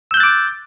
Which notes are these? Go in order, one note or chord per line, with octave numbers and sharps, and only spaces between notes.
D6 E6 F#6 G6 A6